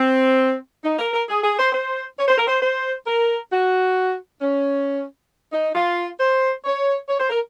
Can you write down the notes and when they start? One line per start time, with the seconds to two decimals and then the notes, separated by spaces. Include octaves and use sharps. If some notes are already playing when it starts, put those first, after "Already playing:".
Already playing: C4
0.84 D#4
0.99 A#4
1.13 A#4
1.29 G#4
1.43 G#4
1.59 C5
1.73 C5
2.18 C#5
2.28 C5
2.37 A#4
2.47 C5
2.62 C5
3.07 A#4
3.52 F#4
4.41 C#4
5.53 D#4
5.75 F4
6.20 C5
6.65 C#5
7.09 C#5
7.20 C5
7.30 A#4